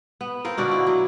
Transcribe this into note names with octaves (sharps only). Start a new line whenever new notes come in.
B3
C4 F4 A#4
B2 D3 F#4 D5
E4
F#3